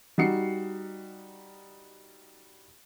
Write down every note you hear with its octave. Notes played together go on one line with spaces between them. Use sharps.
G3 D#4 F#4 C7 C#7